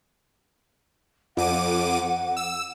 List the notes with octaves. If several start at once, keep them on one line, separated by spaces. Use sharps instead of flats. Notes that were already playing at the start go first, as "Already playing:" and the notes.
F2 F#5 D6 D#7
E6